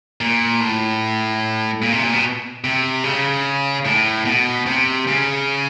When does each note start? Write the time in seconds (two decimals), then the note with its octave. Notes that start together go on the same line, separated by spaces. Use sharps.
0.21 A#2
0.60 A2
1.82 A#2
1.92 C3
2.03 A#2
2.14 B2
2.64 C3
3.04 C#3
3.85 A2
4.25 B2
4.66 C3
5.07 C#3